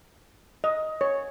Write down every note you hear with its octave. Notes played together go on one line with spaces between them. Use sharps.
D#5
C#5